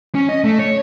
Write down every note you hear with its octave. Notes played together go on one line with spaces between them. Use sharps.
C#4
D#5
A3
C#5